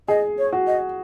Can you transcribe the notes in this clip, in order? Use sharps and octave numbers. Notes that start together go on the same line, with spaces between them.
G#4 D#5
C#5
F#4
D#5